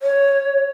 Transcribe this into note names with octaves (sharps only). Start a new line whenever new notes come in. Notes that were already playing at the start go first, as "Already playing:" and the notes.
C#5